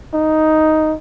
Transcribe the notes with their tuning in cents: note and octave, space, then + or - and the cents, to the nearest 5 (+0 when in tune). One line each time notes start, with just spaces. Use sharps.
D#4 +5